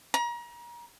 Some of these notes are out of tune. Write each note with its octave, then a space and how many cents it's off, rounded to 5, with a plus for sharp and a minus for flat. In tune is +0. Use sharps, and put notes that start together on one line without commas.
A#5 +35